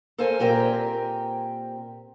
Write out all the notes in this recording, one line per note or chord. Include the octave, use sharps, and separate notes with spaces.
A4 A#4 C5 F5 G#5
A#2 C4 G4 A#4 G5 G#5